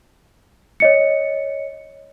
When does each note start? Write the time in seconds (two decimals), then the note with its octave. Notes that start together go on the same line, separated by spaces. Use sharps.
0.80 C#5 D#5 C#7